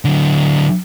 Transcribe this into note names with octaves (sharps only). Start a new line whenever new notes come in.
D3 F#3